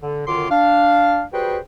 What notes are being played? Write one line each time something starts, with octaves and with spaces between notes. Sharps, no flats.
D3
F#2 D3 D#3 F4 C6 D6
D4 F5
G3 F#4 G#4 B4 C5 G5